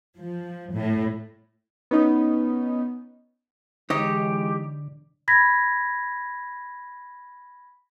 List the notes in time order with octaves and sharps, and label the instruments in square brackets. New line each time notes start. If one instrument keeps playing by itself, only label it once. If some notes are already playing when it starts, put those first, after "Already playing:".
[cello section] F3
A2
[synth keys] B3 C#4 D#4
[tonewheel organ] D3 [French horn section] E3 G#3 [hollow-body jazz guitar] D#4 C#5 D#5 [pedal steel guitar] G4
[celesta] B5 G#6 A#6 B6